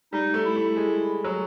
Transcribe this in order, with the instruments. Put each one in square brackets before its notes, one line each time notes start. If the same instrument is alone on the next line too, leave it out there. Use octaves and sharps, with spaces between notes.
[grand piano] G3 [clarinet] D#4
[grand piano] A3
[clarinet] E4
[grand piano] A3
G#3
F#3